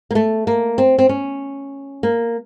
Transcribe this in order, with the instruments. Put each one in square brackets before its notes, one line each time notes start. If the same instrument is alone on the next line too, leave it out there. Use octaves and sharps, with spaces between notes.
[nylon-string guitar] A#3
A3
A#3
C4
C4
C#4
A#3